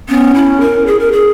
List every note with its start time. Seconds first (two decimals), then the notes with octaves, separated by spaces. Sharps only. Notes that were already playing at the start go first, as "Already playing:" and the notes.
0.09 B3 C#4
0.35 E4
0.60 A#4
0.87 G#4
0.99 A#4
1.12 G#4